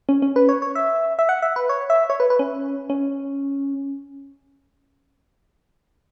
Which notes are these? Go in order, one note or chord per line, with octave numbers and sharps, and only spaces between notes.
C#4
C#4
B4
C#5
C#5
E5
E5
F#5
E5
B4
C#5
E5
C#5
B4
B4
C#4
C#4